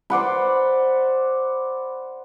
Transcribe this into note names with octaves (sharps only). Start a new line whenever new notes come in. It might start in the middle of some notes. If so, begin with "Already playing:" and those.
C5 D5 F#5 B5